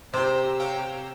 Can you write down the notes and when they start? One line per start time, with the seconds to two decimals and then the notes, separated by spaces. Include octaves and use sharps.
0.14 C3 G4 C5 G5 A#5 E6
0.60 C#5 F5 G5